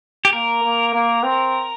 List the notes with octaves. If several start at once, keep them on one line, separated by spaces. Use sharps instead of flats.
G4
A#3 A#4
A#3
A#3
C4